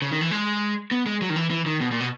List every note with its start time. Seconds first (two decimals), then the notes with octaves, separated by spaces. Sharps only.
0.02 C#3
0.12 D#3
0.21 E3
0.31 G#3
0.91 B3
1.06 G#3
1.22 F#3
1.30 D#3
1.36 E3
1.51 E3
1.66 D#3
1.81 B2
1.91 A#2
2.00 B2